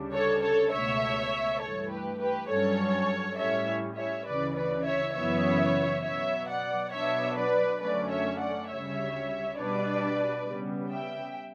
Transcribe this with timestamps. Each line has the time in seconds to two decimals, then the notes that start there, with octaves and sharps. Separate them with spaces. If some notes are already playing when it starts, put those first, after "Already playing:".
Already playing: D2 C#3 G3 D4
0.12 A4 C#5
0.42 A4 C#5
0.72 C#2 B2 A3 C#5 E5
1.60 G2 E3 A3 A4 C#5
1.91 G4 B4
2.20 G4 B4
2.49 G2 F#3 C#4 A4 C#5
3.38 A2 G3 C#4 C#5 E5
3.97 C#5 E5
4.26 D2 C#3 E3 B4 D5
4.56 B4 D5
4.85 C#5 E5
5.15 F#2 C#3 E3 B3 E4 C#5 E5
6.04 B2 F#3 B3 C#5 E5
6.47 D5 F#5
6.92 B2 F#3 B3 D4 C#5 E5
7.36 B4 D5
7.80 F#2 D3 F#3 A3 C#4 B4 D5
8.11 C#5 E5
8.39 D5 F#5
8.69 D2 C#3 G3 C#5 E5
9.58 B2 G3 D4 B4 D5
10.47 C#3 G3 B3
10.91 E5 G5